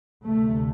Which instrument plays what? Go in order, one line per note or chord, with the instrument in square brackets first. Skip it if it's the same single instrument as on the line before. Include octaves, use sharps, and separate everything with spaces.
[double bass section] D2 C3 A3